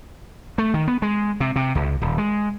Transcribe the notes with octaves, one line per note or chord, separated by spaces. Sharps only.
A3
D#3
B3
G#3
C3
C3
C#2
D#1
G#3